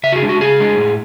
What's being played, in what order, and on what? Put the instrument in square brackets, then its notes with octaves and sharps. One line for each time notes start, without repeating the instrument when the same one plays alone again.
[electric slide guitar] C#3 E5
F#4
G#4
G#3 D4
F#4
C#3 G#4
G#3 D4
A2